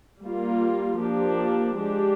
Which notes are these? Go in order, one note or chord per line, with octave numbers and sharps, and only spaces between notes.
G3 A#3 F4
F3 A#3 D4 G4
G#3 D4 G4